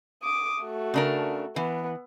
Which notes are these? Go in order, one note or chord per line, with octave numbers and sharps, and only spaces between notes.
D6 D#6
A3 F#4
C#3 D4 A#4
E3 B3